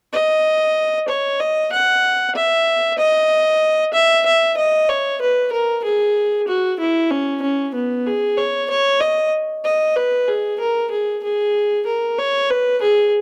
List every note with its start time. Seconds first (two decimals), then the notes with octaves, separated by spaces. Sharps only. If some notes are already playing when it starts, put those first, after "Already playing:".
0.13 D#5
1.08 C#5
1.40 D#5
1.72 F#5
2.35 E5
2.98 D#5
3.93 E5
4.26 E5
4.57 D#5
4.89 C#5
5.21 B4
5.52 A#4
5.84 G#4
6.48 F#4
6.80 E4
7.11 C#4
7.42 C#4
7.74 B3
8.06 G#4
8.37 C#5
8.70 C#5
9.01 D#5
9.65 D#5
9.96 B4
10.28 G#4
10.60 A#4
10.91 G#4
11.23 G#4
11.86 A#4
12.18 C#5
12.50 B4
12.82 G#4